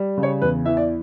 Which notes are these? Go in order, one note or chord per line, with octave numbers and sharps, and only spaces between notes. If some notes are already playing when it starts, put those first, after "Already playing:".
Already playing: G3
C#3
C#5
E2 B4
E3 E5
D5